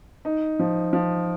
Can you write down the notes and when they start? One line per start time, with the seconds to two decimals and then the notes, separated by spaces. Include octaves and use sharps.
0.25 D#4
0.59 F3
0.93 F3